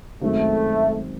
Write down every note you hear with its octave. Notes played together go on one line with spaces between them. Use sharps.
F#2 D#3 G#3 A3 C4 D#4